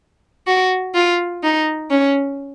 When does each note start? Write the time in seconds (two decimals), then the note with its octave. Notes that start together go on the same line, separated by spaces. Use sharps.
0.47 F#4
0.95 F4
1.44 D#4
1.91 C#4